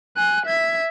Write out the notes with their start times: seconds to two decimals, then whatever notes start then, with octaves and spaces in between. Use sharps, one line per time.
0.16 G#5 F#6
0.46 E5 G#6